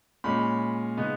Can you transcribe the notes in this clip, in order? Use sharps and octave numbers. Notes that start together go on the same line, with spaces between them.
A#2 G#3 C#4 B5
C#3 G#3 B3 D#4